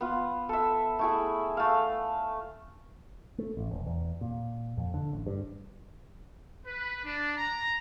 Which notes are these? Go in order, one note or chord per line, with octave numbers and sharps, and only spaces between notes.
B3 F4
A4 E5
A3 E4 G#4
A3 F5
A3
A1
E1
E2
A#2
F2
D3
A1
G2
B4
D4
A#5